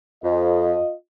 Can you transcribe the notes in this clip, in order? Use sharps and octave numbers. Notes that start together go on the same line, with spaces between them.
F2 F4 D#5